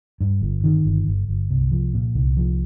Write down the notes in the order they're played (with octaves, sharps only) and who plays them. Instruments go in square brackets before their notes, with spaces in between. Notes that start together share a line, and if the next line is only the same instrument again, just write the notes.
[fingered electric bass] G2
G1
D#3
G1
G1
G1
C2
F3
A#2
C2
F3